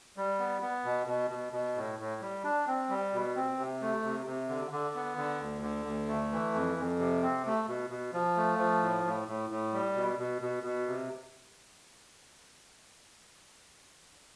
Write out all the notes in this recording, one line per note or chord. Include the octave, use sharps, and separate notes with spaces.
G3
B3
B3
B2
B2
B2
B2
A2
A2
G3
D4
C4
G3
B2
C4
C3
A3
C3
C3
D3
D3
B3
D3
D2
D3
D2
A3
E3
F2
F2
C3
C4
A3
B2
B2
F3
A3
F3
A2
A2
A2
A2
G3
B2
B2
B2
B2
C3